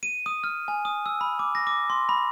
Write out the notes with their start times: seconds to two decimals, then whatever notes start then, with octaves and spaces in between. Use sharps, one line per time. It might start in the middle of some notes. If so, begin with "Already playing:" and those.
0.03 D#7
0.26 D#6
0.44 F6
0.68 G#5
0.85 D#6
1.06 E6
1.21 B5
1.39 D6
1.55 A#6
1.67 D6
1.90 C6
2.09 B5